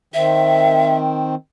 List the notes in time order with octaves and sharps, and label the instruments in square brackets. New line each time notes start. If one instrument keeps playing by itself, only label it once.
[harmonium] D#3 C4 [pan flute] E5